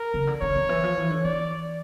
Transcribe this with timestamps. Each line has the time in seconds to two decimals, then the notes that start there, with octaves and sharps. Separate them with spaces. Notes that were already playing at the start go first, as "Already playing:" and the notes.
Already playing: A#4
0.14 C#3
0.27 D3
0.41 D3 C#5
0.55 D3
0.69 E3
0.83 F3
0.97 E3
1.10 D3
1.24 E3 D5